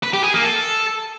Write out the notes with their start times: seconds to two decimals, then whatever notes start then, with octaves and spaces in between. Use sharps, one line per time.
0.03 B4
0.13 G4
0.24 G#4
0.34 A#3
0.44 A4